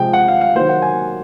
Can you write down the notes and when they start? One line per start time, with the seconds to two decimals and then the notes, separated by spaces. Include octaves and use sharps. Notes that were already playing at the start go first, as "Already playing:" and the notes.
Already playing: C3 F3 G#3 G5
0.13 F#5
0.28 F5
0.41 F5
0.55 D#3 F#3 A#3 C5
0.69 F#5
0.82 G#5